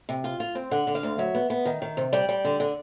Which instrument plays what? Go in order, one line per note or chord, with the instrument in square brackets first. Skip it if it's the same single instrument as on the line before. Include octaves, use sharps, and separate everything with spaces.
[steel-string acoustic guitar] C3
F4
F4
C4
D3 F#5
D3
F5
D2
F#3 E5
B3
B3
D#3
D#3
C3
G3 D5
G3
D3
D3